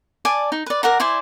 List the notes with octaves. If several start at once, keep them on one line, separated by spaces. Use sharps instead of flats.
D5 G#5 A5
D#4
B4 D5
A#4 D5 F#5 A#5
E4 C5 D5 G#5